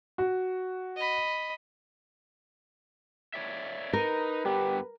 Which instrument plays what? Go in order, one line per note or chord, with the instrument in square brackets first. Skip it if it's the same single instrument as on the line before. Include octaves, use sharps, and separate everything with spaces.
[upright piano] F#4
[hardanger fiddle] D#5 B5
[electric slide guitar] C#5 D5 E5
[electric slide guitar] D#4 [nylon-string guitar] A#4 [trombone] B4
[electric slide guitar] G2 B3 [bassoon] G4